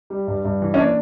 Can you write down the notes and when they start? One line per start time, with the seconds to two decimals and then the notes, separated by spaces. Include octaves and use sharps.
0.10 G3
0.27 G2
0.45 G2
0.62 E3
0.74 C#4
0.79 A#2 D4